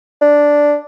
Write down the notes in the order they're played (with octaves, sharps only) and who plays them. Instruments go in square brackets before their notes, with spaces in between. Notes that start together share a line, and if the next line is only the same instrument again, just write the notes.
[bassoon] D4